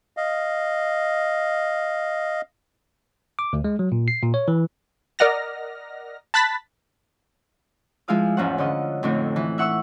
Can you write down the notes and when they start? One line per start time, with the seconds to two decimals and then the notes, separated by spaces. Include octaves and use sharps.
0.17 D#5 F5
3.39 D6
3.53 D2
3.64 G#3
3.79 F#3
3.92 A#2
4.08 C7
4.23 A#2
4.34 C#5
4.48 E3
5.19 A#4 D5 D#5 F#5 F6 A#6
6.34 A5 B5 F#6 A6 B6
8.08 F3 G#3 E4 F5 D#6
8.37 E2 G#2 C#4 F4 C5 F#5
8.58 D3 C#4 D#5
9.03 F2 A2 D3 C4 D4 D#4
9.36 E3
9.58 E5 F#5 C#6 E6